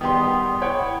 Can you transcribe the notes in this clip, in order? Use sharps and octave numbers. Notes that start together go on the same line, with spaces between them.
E2 D#3 G3 B3 G4 C6 D#6
E4 C#5 F#5 G5